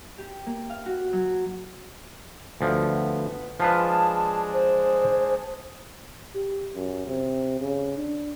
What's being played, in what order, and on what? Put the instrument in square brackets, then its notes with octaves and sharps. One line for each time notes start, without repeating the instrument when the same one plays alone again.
[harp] G4
A#3
F5
F#4
F#3
[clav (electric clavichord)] D2 F3 [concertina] B3
[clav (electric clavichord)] F3 F4 B4 [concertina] G#3 D4 G#4 [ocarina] A5
[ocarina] C5
[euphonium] G4
F#2
C3
C#3
D4